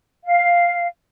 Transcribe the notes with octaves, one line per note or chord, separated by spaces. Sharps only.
F5